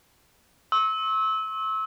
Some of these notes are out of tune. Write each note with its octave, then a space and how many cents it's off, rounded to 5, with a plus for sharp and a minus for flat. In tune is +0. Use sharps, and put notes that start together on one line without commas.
C#6 -45 E6 -25